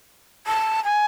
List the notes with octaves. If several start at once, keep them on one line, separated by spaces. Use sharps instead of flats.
A5
G#5